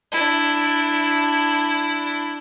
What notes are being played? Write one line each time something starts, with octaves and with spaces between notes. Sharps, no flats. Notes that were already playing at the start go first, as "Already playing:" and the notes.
D4 E4